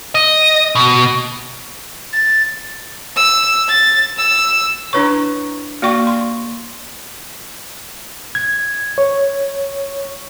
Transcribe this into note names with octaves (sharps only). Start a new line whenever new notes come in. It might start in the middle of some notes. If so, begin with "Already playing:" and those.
D#5
B2
A6
E6
A6
E6
D4 E4 B4 C#5 C#6
A#3 F#4 D5 G5 C#6
C6
G#6
C#5